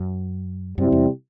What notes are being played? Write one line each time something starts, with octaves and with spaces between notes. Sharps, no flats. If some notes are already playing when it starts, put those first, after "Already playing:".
Already playing: F#2
F#2 C3 G3 C4 E4
E2